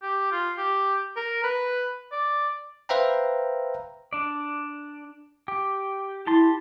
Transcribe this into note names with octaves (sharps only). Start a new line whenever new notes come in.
G4
F4
G4
A#4
B4
D5
B4 C5 E5 F5 G5 A#5
D4 D5
G4
E4 G4 A5 C6